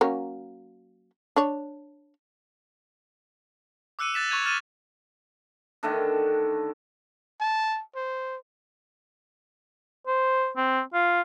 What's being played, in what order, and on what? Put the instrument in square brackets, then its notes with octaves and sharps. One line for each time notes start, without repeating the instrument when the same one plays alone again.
[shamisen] F#3 A#3 C#4
D4 C#5
[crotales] D6 E6 F#6 C#7 D#7
F#6 A6 B6 E7
C#6 F#6 G#6 D#7 F7
F6 A6 D#7 E7
[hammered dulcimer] D3 D#3 A3 D4
[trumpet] A5
C5
[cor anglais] C5
C4
F4